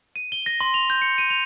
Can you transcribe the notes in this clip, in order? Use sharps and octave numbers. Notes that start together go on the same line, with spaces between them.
D#7
G7
A#6
C6
F7
G6
C#7
D#7
F7